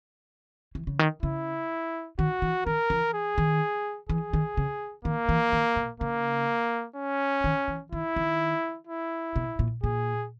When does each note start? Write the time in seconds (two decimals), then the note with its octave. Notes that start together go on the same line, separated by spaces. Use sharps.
0.75 E3
0.87 C#3
0.99 D#3
1.23 C#3 E4
2.19 D#3 F#4
2.42 E3
2.66 D#3 A#4
2.90 E3
3.14 G#4
3.38 D#3
4.09 E3 G#4
4.33 D#3
4.57 C#3
5.05 D#3 A#3
5.29 E3
5.53 D#3
5.76 B2
6.00 C#3 A#3
6.96 C#4
7.44 D#3
7.68 E3
7.92 D#3 E4
8.16 D#3
8.87 E4
9.36 B2
9.59 A#2
9.84 A#2 G#4